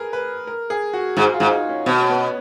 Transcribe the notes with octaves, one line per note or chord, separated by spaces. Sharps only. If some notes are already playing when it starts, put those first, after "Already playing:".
Already playing: G#4 A#4 B4
B4
A#4
G#4
F#4
G#2
F4
G#2
D#4
C#4
B2
C#4
B3